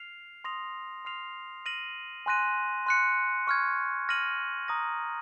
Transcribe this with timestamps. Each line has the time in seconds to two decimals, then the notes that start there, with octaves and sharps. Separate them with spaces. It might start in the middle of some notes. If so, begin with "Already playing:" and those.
Already playing: F6 C7 F7
0.44 C6 D#6 A#6 F7
1.05 C6 F6 C7 F7
1.65 F6 A#6 D#7 F#7
2.26 G#5 C6 F#6 A#6 D#7
2.86 C6 F#6 C#7
3.47 C#6 F6 G#6
4.09 F6 A#6 D#7 F#7
4.68 A#5 D#6 A#6